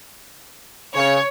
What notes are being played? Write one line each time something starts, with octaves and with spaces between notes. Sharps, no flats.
C#3 C#5